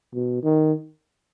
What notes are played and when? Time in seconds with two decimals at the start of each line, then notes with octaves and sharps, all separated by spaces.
0.14 B2
0.43 D#3